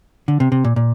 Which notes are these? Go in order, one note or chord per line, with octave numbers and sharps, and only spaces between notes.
D3
C3
C3
A#2
A#2